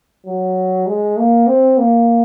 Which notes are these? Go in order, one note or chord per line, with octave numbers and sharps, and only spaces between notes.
F#3
G#3
A#3
C4
A#3